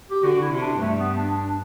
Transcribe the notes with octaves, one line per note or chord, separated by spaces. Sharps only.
G4
D3 F#4
E4
C3
D4
G2 A3
B3
D4
D4